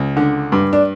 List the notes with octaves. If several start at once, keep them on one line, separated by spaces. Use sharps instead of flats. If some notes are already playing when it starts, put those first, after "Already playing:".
Already playing: C#2
D3
G2
D4